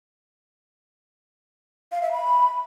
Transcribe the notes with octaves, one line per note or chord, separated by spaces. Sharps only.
F5
E5
B5